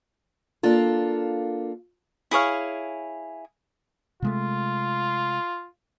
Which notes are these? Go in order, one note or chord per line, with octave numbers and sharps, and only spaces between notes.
A#3 D4 F4 A4
E4 G#4 C#5 F5
C3 G#3 A3 F4